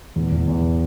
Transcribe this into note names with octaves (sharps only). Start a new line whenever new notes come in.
E2
E2
E2